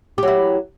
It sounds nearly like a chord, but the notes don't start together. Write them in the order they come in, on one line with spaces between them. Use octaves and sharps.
G4 F#3 E4